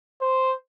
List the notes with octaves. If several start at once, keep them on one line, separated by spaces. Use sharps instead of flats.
C5